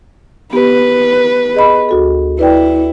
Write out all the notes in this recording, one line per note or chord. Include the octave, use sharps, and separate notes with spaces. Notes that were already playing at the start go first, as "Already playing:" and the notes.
B3 G4 B4
G#4 D#5 B5
D2 F#4 A4
E4 B4 D5 G5